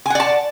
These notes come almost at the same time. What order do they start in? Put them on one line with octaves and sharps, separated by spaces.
G#5 F#5 D5 A5